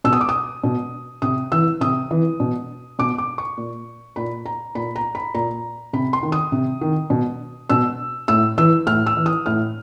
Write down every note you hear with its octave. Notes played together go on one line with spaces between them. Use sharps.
B2 E6
D#6
D6
D#6
B2
C3 D#6
E3 E6
C3 D#6
E3
B2
B2 D6
D6
C#6
A#2
A#2 B5
A#5
A#2 B5
A#5
B5
A#2 A#5
C3 B5
C6
D#3
D#6
C3
D#3
B2
B2 E6
A2 E6
E3 E6
A2 F6
E6
E3
D#6
A2 F6